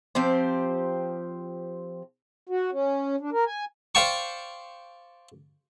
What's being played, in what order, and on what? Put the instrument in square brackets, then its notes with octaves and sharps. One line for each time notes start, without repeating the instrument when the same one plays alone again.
[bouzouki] F3 C4 G4 C5
[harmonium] F#4
C#4
D4
A#4
G#5
[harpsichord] C5 D5 F5 G5 A5 C#6